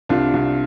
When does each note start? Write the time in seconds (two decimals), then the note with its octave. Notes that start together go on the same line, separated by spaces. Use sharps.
0.09 C2 D4 F4
0.34 C2